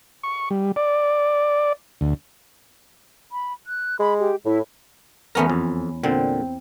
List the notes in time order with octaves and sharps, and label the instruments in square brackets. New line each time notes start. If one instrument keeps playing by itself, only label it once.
[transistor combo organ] C#6
G3
D5
D2
[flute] B5
F#6
[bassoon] G#3 [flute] B5
[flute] G4
[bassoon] A2 [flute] E4
[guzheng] E2 C#4 A#5 [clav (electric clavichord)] A3 B3 A#4
[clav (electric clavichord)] F2
[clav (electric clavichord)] A#2 D3 [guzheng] C4